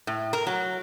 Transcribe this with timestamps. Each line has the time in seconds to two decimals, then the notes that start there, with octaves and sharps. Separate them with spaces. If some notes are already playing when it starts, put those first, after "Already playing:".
0.07 A2
0.33 A#4
0.47 F#3